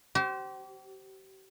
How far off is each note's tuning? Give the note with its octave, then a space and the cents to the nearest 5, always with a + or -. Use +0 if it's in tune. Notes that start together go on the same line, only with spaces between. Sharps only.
G4 -40 C5 +0